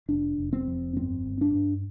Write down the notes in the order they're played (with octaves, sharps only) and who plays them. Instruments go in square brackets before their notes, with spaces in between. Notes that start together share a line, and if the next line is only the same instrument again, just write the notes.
[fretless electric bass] F1 D4
F1
C4
F2
G1 C4
G1
D4
G2